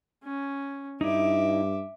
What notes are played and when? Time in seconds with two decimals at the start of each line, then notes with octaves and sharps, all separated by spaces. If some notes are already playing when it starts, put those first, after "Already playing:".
0.24 C#4
1.01 G2 D#4 E4 E5 D6